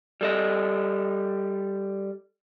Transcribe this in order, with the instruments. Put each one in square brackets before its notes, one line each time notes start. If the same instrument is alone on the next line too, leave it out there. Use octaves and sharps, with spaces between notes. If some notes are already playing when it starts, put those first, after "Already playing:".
[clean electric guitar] G3 A4 D#5